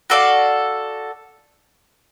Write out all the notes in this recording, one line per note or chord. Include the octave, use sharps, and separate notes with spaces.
F#4 A4 D5 F5